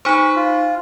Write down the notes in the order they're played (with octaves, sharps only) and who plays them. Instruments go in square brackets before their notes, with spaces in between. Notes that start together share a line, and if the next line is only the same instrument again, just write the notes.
[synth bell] D#4 C5 [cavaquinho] B4 C#6
[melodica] F4